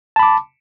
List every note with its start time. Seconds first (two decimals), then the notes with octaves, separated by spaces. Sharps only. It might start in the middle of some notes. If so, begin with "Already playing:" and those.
0.16 A5
0.19 B5
0.23 D6